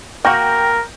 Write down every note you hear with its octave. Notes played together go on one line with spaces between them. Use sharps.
A#3 F#4 A#4 G5 G6 A#6